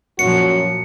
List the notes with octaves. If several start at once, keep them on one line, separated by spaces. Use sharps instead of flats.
F#2 A#2 F3 F#4 C#7